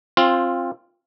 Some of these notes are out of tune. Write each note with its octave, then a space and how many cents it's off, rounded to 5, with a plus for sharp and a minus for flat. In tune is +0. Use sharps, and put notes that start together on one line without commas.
C4 +20 F4 +0